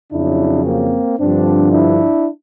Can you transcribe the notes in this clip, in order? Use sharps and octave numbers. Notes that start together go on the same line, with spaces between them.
F2 C#3 F#3 D4 E4
A#3 C4
G2 D3 F3 C4 D4
D4 E4